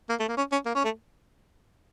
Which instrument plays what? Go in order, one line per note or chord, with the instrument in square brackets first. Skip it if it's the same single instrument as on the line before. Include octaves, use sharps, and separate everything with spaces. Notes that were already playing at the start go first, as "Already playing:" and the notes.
[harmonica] A#3
A3
A#3
C#4
C#4
A#3
C#4
A3